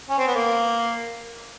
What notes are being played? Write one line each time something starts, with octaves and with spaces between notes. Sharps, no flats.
C#4
C4
B3
A#3